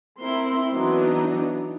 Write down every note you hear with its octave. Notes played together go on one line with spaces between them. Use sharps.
C4 E4 A#4 C6
E3 F#3 B3 D4 D#4